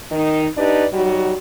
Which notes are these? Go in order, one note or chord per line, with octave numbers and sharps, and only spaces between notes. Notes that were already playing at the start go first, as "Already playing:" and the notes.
D#3 D#4
D4 D#4 G4 B4 D5
F#3 G3 D#4 F#4